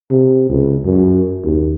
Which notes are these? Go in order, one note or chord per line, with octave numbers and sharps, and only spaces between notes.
C3
C#2
F#2
D#2